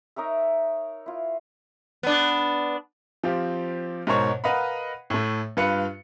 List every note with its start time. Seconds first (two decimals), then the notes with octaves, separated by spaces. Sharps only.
0.16 D#4 A#4 C#5 E5
1.06 E4 F4
2.03 B3 D4
3.23 F3 C4 F4 G4
4.07 G#2 B2 A#4 C5 C#5 C#6
4.44 A#4 B4 D#5 F5 F#5 B5
5.10 A2 A3
5.57 G2 F4 B4 F5 B5 C#7